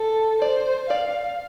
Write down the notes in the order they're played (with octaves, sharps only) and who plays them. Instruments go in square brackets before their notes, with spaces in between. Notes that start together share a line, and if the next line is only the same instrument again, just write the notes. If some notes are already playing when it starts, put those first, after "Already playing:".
Already playing: [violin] A4
[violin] C5 [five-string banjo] D5
[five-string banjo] D5 [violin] F5